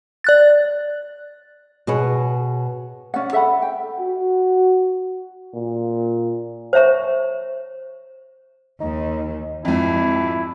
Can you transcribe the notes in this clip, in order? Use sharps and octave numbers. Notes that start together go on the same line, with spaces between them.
D5 F#6 A6
B2 G#4 B4 C#5
C#4 D5 F#5
A4 E5 F#5 B5
G5
F#4
A#2
C5 C#5 E5 A#5 C#6
D#2 D#3 D#4
G#1 F2 E4